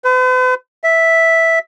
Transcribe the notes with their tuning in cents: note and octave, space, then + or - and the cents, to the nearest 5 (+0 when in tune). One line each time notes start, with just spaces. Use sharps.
B4 +45
E5 -5